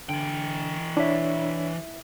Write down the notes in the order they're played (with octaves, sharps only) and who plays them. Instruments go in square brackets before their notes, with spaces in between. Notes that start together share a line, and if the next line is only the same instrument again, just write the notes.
[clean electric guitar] D3 [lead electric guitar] E3 G5
[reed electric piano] D4 C#5 [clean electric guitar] E4 E5